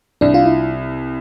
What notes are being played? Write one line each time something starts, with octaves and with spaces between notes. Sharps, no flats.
C2 D4
F4
E4